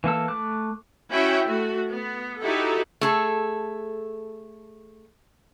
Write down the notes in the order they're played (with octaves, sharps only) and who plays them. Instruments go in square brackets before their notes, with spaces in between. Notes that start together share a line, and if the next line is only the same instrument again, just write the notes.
[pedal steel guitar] E3 A#3 A4 E6
A3 D6 F#6
[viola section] C#4 E4 F#4 E5 G5
A3 F#4
B3
D#4 E4 F#4 G4 A4
[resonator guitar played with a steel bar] A3 G#4 A4